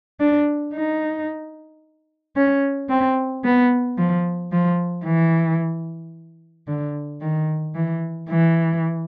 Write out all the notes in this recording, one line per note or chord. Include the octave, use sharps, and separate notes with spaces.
D4
D#4
C#4
C4
B3
F3
F3
E3
D3
D#3
E3
E3